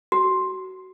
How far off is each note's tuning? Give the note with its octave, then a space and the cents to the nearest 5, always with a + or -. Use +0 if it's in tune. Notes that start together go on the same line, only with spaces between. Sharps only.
F#4 +20